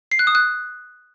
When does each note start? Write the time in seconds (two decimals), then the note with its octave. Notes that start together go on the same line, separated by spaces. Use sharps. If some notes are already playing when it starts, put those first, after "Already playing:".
0.12 C7
0.19 F#6
0.27 D#6
0.35 F#6